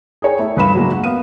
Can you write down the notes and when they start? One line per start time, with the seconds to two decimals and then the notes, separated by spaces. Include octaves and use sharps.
0.22 G#4 A#4 C#5 G5 G#5
0.39 A3 E4
0.57 C#2 G2 B4 F5 B5 E7
0.75 F#3 G#3 A#3
0.92 F#5
1.04 B3 F5 D#7